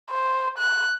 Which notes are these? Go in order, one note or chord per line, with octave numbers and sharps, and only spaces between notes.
C5
F#6